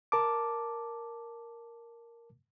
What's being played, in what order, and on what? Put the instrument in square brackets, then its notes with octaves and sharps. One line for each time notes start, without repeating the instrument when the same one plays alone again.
[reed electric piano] A#4 A5 D6